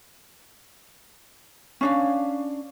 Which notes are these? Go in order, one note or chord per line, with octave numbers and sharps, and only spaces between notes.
C#4 D4 F5